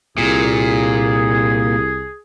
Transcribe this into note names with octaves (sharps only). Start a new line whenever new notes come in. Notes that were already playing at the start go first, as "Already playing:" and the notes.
C2 A#2 G#4